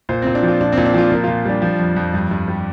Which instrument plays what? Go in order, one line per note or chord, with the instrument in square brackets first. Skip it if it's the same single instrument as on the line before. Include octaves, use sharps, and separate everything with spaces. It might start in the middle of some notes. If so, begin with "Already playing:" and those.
[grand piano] A#2 C5
A#2 C4
D4
F3
F4
A#2 D4
C4
A#2
D4
F3 F4
A#2 A#4
A#2 F4
G3 D4
F3
F2
F2
G2
G2
G3